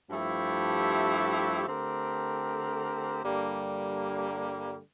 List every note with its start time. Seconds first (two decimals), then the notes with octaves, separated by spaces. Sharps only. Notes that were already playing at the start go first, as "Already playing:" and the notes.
0.10 G2 F3 A3 E4 G4
1.67 D3 A3 C4 G4 A#4
3.23 G2 D3 G3 A#3